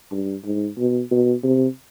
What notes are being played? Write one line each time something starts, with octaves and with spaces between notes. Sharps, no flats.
G2
G#2
B2
B2
C3